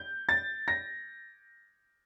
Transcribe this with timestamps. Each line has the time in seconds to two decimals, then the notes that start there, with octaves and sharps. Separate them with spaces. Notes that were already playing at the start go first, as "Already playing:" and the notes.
Already playing: G6
0.29 A6
0.68 A#6